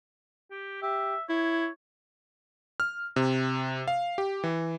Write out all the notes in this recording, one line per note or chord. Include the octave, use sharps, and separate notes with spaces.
G4
G4 E5
E4 C#5
F6
C3
F5
G4
E3